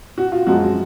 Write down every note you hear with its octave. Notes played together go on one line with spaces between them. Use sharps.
F#4
F4
F#2 F3 G#3 F#4